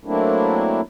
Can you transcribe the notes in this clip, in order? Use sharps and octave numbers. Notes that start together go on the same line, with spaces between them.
F#3 A3 A#3 C4 D4 E4